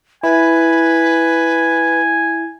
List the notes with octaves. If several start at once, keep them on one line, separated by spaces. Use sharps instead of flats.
E4 B4 G#5